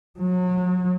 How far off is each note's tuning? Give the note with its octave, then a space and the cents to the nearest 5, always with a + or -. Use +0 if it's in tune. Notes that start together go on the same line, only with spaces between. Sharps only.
F#3 -35